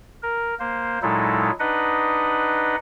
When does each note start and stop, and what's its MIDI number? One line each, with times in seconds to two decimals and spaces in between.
0.23 0.55 70
0.60 0.99 58
0.60 0.99 72
1.02 1.51 46
1.02 1.51 54
1.02 1.51 56
1.02 1.51 63
1.02 1.51 64
1.02 1.51 69
1.60 2.76 62
1.60 2.76 63
1.60 2.76 71
1.60 2.76 75
1.60 2.76 78